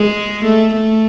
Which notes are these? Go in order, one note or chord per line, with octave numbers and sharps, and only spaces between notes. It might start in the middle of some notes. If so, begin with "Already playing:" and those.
Already playing: G#3
A3
A3